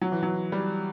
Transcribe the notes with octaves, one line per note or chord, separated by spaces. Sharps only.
F#3
E3
F#3
G3